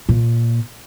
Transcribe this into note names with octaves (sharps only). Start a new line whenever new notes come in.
A#2